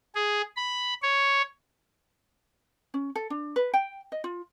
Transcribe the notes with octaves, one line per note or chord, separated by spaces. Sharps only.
G#4
B5
C#5
C#4
A4
D4
B4
G5
D#5
F4